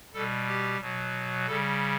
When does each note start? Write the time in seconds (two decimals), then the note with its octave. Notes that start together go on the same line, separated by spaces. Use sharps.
0.14 B2 G3 A4
0.48 G4
0.81 B2 F#3
1.47 C#3 G3 A4